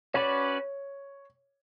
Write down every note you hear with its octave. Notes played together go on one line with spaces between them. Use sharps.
C#4 F#4 B4 C#5 D5